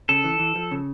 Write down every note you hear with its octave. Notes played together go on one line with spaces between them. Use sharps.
C#3 A4
E3
E3
F3
C#3